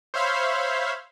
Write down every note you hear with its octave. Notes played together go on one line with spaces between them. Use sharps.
C5 C#5 E5 F5 B5 C6